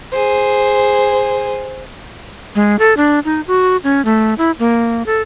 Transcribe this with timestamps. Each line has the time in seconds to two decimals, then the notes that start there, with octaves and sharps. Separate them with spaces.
0.12 G#4 C5
2.55 G#3
2.79 A4
2.97 D4
3.25 D#4
3.47 F#4
3.84 C#4
4.05 A3
4.38 E4
4.59 A#3
5.06 A4